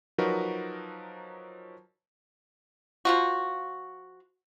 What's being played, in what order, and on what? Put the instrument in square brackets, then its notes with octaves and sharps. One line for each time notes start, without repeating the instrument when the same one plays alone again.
[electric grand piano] F3 F#3 D#4 F#4 A#4 B4
[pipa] F3 F4 F#4